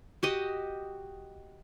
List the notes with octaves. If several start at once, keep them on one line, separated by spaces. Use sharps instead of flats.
F#4 G4 D#5